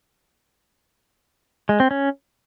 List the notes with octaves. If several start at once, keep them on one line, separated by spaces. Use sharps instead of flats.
G#3
C4
C#4